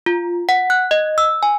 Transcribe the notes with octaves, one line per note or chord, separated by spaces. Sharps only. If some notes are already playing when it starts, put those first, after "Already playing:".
F4
F#5
F#6
D#5
E6
G#5